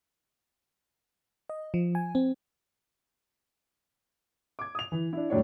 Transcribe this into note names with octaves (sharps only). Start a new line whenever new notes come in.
D#5
F3
G#5
C4
D6 G#6
D#6 F7
E3
D4 E4
E1 F#2 A2 D4 C#5